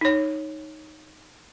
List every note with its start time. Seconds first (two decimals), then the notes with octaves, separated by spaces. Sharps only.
0.01 D#4 C#5